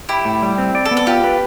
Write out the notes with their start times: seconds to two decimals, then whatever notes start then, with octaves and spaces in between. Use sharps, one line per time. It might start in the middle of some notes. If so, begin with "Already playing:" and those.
0.09 E4 G4
0.25 A2
0.42 G3
0.58 C4
0.75 D5
0.85 A4
0.91 B3
0.97 A4
1.07 F4 G4
1.24 B4